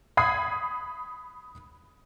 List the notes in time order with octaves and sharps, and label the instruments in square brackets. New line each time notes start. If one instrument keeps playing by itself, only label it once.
[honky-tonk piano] B5 D#6 G#6 C7